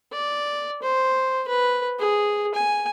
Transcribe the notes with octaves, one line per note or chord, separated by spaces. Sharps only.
D5
C5
B4
G#4
G#5